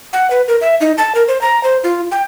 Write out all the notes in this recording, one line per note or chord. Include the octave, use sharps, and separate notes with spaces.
F#5
B4
A#4
E5
D#4
A5
A#4
C5
A#5
C5
F4
G5